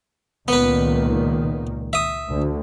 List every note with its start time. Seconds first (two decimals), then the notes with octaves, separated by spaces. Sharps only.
0.48 C#2 A#2 D#3 B3 B4
1.93 E5 D#6
2.30 D2